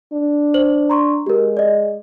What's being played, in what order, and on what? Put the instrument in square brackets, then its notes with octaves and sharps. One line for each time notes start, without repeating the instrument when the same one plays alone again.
[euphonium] D4
[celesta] C5 F#7
A#5 C6 C#6
[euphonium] G#3 [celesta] G4 A#4
[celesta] D5 D#5